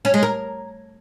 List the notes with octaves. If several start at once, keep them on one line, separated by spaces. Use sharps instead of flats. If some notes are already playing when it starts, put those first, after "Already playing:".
C#4
G#3
A#4